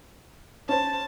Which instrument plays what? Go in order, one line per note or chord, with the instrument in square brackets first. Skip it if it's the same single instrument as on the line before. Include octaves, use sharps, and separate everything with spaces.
[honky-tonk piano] C#4 C5 [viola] A5